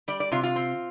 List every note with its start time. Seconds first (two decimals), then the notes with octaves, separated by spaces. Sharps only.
0.08 G3 D5
0.20 D5
0.32 C3 F4
0.43 F4
0.56 C4